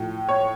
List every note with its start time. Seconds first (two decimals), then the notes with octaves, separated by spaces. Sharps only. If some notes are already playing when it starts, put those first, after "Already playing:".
Already playing: A2 F3
0.29 C#5